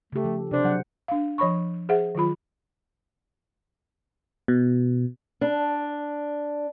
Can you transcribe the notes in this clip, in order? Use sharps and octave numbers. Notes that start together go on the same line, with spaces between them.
C#3 A3 G4
F3 A4
C3 D4 C5
F#3 F#5
D4 F5
F3 C#5 B5 C#6
G#4 C5 E5 F#5
D#3 F#3 F4 B5
B2
D4